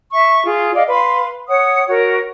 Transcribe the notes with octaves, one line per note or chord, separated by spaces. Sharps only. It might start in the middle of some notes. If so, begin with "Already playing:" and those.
E5 C#6
F4 G#4
D5 D#5 F5
B4 F5 B5 C6
C#5 F#5 D#6
F#4 A#4 C#5